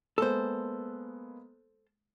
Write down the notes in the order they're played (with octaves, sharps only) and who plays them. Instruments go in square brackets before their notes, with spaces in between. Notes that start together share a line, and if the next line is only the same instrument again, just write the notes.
[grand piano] G#3 A#3 B3 [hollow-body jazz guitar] A4 C5